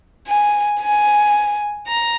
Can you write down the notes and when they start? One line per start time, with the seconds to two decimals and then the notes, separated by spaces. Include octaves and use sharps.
0.28 G#5
0.81 G#5
1.88 A#5